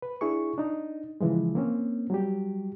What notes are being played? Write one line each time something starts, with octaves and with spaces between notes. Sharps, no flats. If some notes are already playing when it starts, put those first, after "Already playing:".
B4
D4 E4 G#4 C#6
D4 D#4
C#3 E3 F3 G#3
A#3 C4 C#4
F#3 G3 G4